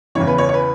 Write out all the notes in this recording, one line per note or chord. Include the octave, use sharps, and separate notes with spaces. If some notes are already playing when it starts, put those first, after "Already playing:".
E2 C#3 E3 C#5
B4
C#5
C#5
B4